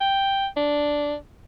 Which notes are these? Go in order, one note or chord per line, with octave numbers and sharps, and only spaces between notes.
G5
D4